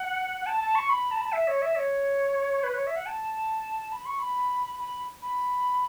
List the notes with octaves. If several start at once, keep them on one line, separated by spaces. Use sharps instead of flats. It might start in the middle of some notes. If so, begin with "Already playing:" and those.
Already playing: F#5
F#5
A5
A5
C#6
B5
A5
B5
A5
E5
C#5
E5
C#5
B4
C#5
E5
F#5
A5
B5
C#6
B5
B5
B5